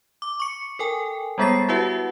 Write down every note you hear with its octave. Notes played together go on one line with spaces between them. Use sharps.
D6
C#6 C#7
A4 A#4 G5 G#5
G3 G#3 B3 G#4 A6 C7
E4 F#4 G4 B4 E5 F#5